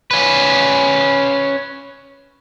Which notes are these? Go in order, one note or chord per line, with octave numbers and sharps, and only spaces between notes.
C#4 B4